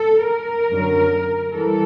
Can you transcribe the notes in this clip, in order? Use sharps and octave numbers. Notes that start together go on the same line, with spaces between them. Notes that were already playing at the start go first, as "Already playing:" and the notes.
Already playing: A4
A#4
F#2 D3 F#3
E3 G3 A4